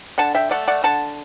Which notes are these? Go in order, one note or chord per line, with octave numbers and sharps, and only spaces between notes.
D3 F#5 A5
E5 G5
A3 D5 F#5
D5 F#5
D3 F#5 A5